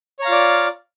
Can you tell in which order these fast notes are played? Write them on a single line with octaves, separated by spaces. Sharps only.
C#5 A#5 F5 F4 D5